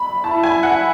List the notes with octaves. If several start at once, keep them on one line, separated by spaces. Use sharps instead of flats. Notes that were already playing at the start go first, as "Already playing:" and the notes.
Already playing: B5
E4 A5
G#5
F#5